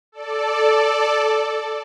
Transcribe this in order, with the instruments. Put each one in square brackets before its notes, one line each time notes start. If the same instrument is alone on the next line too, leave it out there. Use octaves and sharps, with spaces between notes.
[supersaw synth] A4 D5